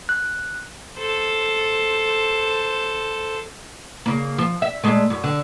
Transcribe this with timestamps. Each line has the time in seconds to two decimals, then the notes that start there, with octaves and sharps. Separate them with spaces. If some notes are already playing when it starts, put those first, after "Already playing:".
0.09 F#6
0.97 A4 C5
4.06 C#3 A#3
4.38 F3
4.62 E5
4.84 A#2 G#3 A3
5.10 F#2
5.24 D3